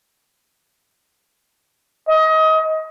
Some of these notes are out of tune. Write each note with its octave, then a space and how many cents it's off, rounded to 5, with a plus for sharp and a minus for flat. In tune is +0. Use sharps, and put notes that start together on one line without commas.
D#5 +25